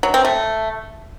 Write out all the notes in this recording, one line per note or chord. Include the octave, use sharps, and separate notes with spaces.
F#3
C4
A3